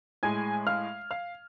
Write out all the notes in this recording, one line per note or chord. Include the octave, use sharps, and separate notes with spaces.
A2 G#3 G#5 G#6
F5 F6
F5 F6